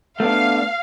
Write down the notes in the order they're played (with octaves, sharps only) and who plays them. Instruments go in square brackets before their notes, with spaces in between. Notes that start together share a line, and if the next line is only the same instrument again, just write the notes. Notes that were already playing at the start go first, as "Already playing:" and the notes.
[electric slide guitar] A3 B3 D4 [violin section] F5